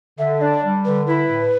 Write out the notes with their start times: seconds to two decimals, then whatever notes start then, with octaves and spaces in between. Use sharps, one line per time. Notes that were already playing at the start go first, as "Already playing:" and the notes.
0.19 D3 E5
0.41 D4 D5
0.63 G3
0.85 D3 B4
1.07 E4 B4
1.29 A2